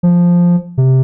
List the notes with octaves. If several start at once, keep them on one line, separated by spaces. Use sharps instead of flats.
F3
C3